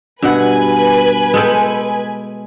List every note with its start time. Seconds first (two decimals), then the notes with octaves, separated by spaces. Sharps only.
0.23 G2 B2 B4 F#5 G#5
1.34 G#3 A4 G5